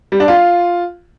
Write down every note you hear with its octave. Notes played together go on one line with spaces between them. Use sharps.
G3
D4
F4